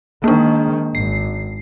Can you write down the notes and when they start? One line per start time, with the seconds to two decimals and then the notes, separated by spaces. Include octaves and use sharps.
0.24 D#3 G#3 A#3 D4
0.95 G#1 C7